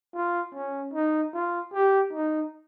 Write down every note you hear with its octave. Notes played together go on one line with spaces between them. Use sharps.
F4
C#4
D#4
F4
G4
D#4